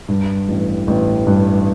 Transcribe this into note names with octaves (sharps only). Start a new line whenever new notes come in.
G2
A1
A1
G2